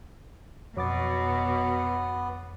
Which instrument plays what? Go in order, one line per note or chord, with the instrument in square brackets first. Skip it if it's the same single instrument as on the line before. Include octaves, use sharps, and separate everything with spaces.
[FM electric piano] F2 D6 A6 [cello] B2 [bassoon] F#3 [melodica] B3